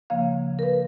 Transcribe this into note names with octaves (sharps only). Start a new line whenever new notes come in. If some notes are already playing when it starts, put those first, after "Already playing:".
D2 C#3 F3 A#3 F5
A#4
B4